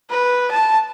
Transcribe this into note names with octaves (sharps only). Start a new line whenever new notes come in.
B4
A5